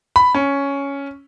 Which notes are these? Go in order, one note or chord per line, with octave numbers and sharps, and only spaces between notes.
B5
C#4